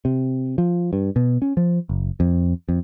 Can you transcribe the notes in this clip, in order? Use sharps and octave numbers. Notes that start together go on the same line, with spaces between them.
C3
F3
G2
B2
C#4
F3
F#1
F2
F2